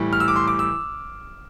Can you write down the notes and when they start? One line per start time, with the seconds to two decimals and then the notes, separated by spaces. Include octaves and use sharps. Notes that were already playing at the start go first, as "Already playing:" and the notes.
Already playing: A2 E3 G3
0.13 F6
0.20 E6
0.28 D6
0.36 C6
0.48 D6
0.59 E6